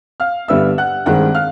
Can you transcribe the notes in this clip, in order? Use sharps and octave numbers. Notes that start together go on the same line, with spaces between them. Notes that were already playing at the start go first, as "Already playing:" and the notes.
F5 F6
G2 D3 G3 B3 E5 E6
F#5 F#6
G2 D#3 G#3 C4 F#5 F#6
F5 F6